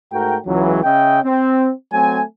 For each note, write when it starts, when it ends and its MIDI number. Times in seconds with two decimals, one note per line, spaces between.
0.12 0.37 44
0.12 0.37 57
0.12 0.37 66
0.12 0.37 70
0.12 0.37 79
0.46 0.80 37
0.46 0.80 52
0.46 0.80 54
0.84 1.19 49
0.84 1.19 61
0.84 1.19 75
0.84 1.19 76
0.84 1.19 79
1.23 1.71 60
1.92 2.21 54
1.92 2.21 57
1.92 2.21 60
1.92 2.21 80